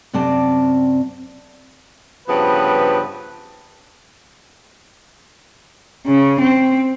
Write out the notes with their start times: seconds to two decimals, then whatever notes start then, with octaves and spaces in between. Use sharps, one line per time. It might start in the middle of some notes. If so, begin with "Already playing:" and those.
0.13 F#2 C3 C4 D5 A5
2.28 G2 C#3 F3 B3 B4
6.07 C#3
6.40 C4